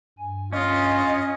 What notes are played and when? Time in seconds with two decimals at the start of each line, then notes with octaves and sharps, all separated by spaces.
0.19 G2 G#5
0.53 C#4 F4 D#5